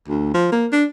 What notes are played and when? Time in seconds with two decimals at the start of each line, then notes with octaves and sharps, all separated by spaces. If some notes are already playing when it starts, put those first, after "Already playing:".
0.08 D2
0.34 F3
0.52 A#3
0.72 D4